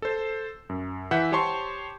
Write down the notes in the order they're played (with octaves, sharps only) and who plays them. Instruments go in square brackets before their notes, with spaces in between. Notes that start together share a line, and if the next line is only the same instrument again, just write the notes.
[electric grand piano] A4 C5
F#2
E3 E5 F#5 G6
G4 C5 C#5 A5 C6 C#6